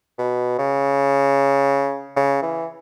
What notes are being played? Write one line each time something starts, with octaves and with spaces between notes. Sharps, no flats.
B2
C#3
C#3
E3